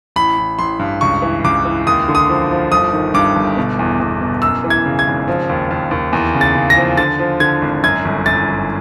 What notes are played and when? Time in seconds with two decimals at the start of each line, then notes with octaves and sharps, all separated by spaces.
0.16 A1 B5
0.38 A1
0.59 A1 C6
0.79 G2
1.01 C#2 C#6
1.22 E3
1.44 C#2 D6
1.65 E3
1.87 D#2 D#6
2.09 D3
2.15 D#6
2.29 F3
2.51 F3
2.72 G1 D#6
2.93 D#3
3.14 G2 D6
3.36 G1
3.57 B2
3.79 E2
4.00 E2
4.21 B2
4.42 F#2 E6
4.64 E3
4.70 G#6
4.86 C#3
4.99 G#6
5.07 G#1
5.28 F3
5.49 D#2
5.71 D#2
5.91 D#2
6.13 E2
6.35 C#3
6.41 A6
6.55 C#3
6.70 A#6
6.77 F3
6.97 D3 A6
7.19 F3
7.40 D3 G#6
7.62 G#1
7.83 F#2 G#6
8.05 G1
8.26 F#2 A6
8.48 G1